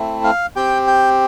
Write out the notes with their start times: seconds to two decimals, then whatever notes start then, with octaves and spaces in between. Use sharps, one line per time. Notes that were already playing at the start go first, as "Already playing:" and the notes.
Already playing: A3 C4 E4
0.24 F5
0.56 C4 G4 G5
0.87 G5